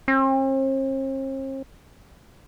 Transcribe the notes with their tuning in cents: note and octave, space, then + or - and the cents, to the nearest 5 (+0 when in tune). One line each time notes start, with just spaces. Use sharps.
C4 +45